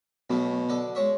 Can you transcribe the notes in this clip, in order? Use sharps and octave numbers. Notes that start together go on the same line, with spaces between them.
B1 B2 A3
D3 A4
G#3 C#5 E5